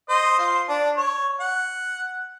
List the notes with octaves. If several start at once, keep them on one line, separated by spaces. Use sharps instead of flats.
C5 D#5
F4 C5
D4
C#5
F#5